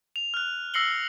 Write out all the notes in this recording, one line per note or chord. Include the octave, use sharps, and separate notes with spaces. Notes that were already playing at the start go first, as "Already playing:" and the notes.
F7
F6 F#6
E6 A#6 C7 C#7 F#7 G7